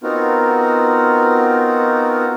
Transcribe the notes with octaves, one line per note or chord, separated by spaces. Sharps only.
B3 C4 D#4 F4 F#4 A#4